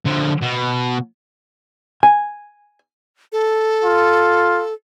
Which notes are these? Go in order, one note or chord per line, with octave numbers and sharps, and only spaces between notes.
D3 F3
B2
G#5
A4
F4